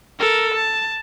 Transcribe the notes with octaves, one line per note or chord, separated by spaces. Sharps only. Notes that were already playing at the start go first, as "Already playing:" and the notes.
A4 A#4
A5